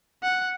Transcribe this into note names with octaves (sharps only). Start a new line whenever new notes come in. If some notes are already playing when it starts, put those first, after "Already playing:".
F#5